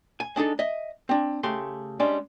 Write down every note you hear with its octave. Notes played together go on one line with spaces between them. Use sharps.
G#5
G#3 D4 D#4 A4
D#5 E5
C4 D4
C#3 A3 G4 C6
G3 G#3 C#4 D4